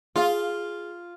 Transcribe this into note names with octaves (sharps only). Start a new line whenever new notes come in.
F4 G#4 F5